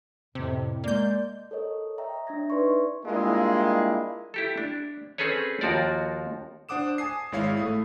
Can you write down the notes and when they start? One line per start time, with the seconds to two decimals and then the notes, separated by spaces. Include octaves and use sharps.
0.35 F2 A2 C3
0.84 G#3 A#3 D5 G6
1.51 A4 A#4 C#5 D#5
1.98 C#5 D#5 E5 G5 A#5
2.27 D4 E5 G#6 A#6
2.50 D#4 B4 D5 C6 C#6
3.05 G3 G#3 A#3 D4 E4 F4
4.34 E4 G4 A4
4.58 D4
5.18 C4 C#4 G#4 A4 B4 C#5
5.61 D#2 F3 F#4 A#4 D5
6.69 D4 C5 F#5 D6 D#6 E7
6.98 G#5 A5 D#6 C7
7.32 G#1 G#3 E4 C#5 F5 C7
7.57 A2 A3 D#6